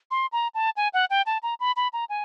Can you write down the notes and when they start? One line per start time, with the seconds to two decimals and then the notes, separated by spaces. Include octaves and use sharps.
0.11 C6
0.32 A#5
0.55 A5
0.77 G#5
0.94 F#5
1.10 G5
1.26 A5
1.43 A#5
1.60 B5
1.76 B5
1.93 A#5
2.09 G#5